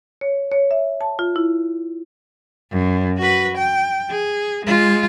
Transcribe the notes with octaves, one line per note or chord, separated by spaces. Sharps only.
C#5
C#5
E5
A5
F4
E4
F#2
F#4 B4
G5
G#4
G#3 F4